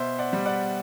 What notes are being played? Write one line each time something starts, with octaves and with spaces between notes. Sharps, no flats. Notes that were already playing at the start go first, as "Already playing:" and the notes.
Already playing: B2 C5 E5
D5 F#5
G3
D5 F#5